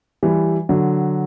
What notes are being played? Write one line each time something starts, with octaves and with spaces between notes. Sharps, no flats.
E3 G3
D3 F#3